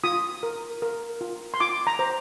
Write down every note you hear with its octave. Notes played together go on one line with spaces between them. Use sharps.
F4 D#6
A#4
A#4
F4
C6
F4 D6
A#5
C5